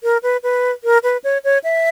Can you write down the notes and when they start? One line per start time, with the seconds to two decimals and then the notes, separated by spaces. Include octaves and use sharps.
0.03 A#4
0.23 B4
0.43 B4
0.84 A#4
1.03 B4
1.24 C#5
1.44 C#5
1.64 E5